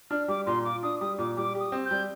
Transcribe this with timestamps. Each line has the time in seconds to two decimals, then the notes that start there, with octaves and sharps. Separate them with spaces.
0.11 D4 F6
0.28 G3 D6
0.46 A#2 C6
0.64 F4 D6
0.83 D4 D#6
1.00 G3 D#6
1.18 A#2 D6
1.36 G3 D6
1.55 G4
1.60 D#6
1.72 C4
1.85 G6
1.91 G3